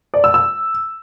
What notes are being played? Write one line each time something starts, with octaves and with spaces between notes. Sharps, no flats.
D5
E6
E6